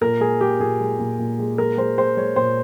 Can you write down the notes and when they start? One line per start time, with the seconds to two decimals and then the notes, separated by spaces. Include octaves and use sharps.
0.01 A#2 A#4
0.20 G#3 G#4
0.41 G#3 G4
0.60 A#2 G#4
0.80 G#3
0.99 A#2
1.19 A#2
1.39 G#3
1.58 G#3 A#4
1.77 G#3 C5
1.98 G#3 C5
2.17 G#3 C#5
2.36 A#2 C5